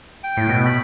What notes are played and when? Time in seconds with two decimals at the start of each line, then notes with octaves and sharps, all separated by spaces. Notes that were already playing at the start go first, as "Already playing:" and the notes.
0.24 G5
0.37 A2
0.49 B2
0.66 B5